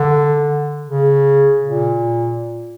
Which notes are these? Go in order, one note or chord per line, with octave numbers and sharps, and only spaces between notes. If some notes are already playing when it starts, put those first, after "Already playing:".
Already playing: D3
C#3
A#2